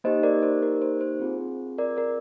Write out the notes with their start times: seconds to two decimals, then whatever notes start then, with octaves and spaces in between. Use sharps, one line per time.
0.04 A#3 D#4 G4 C5 D#5
0.23 A#4 D5
0.43 C5
0.63 A#4
0.82 C5
1.01 C5
1.20 C4 F4 G#4
1.78 A#4 D5
1.97 A#4 D5